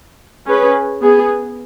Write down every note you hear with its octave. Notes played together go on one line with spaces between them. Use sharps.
C#4 G#4 B4
B3 G#4